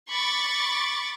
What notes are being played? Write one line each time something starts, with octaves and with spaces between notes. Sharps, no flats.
B5 C#6 D6 A6